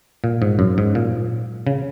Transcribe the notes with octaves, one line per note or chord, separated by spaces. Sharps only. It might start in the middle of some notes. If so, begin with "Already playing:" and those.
A#2
G#2
F#2
G#2
A#2
C#3